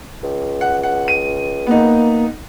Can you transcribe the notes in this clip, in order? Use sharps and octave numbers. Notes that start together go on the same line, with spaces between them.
C#2
F#5
F#5
D#7
A#3 B3 D#4